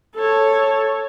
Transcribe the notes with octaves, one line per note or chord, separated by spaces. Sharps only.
A4 C#5